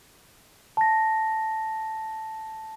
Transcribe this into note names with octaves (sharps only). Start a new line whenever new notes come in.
A5 A#6